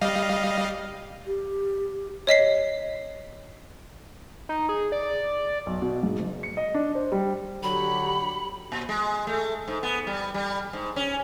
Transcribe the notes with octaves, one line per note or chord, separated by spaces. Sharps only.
G3 D#5 F5
G4
C#5 D#5 B6 C7
D#4
G#4
D5
B1
B2
G#2
F#1
C#7
D#5
D4
C5
G3
D3 F#3 G4 B5 B6 C#7
A#2
G#3
A3
G#2
B3
G3
G3
G#2
C#4